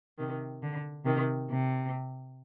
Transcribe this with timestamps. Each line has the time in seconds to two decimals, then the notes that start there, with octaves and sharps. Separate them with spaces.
0.19 C3 D#3
0.63 D3
1.05 C3 D#3
1.50 C3